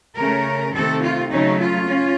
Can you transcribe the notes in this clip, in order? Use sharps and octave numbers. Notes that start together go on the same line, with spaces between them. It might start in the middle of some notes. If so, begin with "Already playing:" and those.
C#3 A3 C#4 A#4
C3 D#3 A3 C4 A4
F4
C#3 F#3 A3 C#4 D#4
F4
C#4